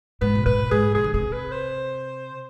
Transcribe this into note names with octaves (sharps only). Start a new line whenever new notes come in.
G#2 B4
B2
G#2 B4
G#2 G#4
C3 G#4
D3
C3 G#4
B4
C5